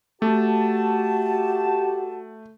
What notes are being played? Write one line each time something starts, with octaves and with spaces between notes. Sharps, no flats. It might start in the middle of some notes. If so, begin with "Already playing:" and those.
A3 F#4 G4 A5